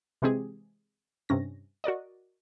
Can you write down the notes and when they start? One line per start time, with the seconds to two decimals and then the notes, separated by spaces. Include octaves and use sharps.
0.22 C3 E3 G#3 C4 G4 G#4
1.29 G2 C3 C#4 A#6
1.84 F#4 A#4 D5 D#5